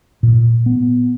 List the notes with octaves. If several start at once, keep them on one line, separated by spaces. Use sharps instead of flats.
A#2
B3